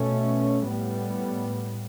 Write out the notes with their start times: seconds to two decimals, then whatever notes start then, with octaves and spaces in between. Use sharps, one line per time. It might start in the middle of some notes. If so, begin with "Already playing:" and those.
Already playing: B2 A3 C#4
0.69 A2 G3 B3